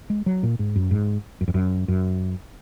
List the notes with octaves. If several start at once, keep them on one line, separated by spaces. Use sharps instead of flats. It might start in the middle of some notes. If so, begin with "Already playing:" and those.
G#3
F#3
A#2
G#2
F#2
G#2
F#2
F2
F#2
F#2